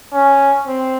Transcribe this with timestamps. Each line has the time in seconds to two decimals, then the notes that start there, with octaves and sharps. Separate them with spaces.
0.13 C#4
0.68 C4